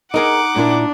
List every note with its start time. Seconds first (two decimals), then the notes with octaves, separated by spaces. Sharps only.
0.14 D#4 G#4 A#4 D#5 F#5 D6
0.56 A#2 D4 E4 A#4